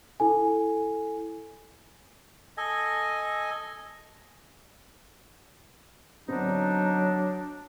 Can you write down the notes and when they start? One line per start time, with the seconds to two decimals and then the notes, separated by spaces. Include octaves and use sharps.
0.20 E4 A4 G#5
2.57 A4 D#5 G#5
6.28 D3 F#3 B3 C4 D4 D#4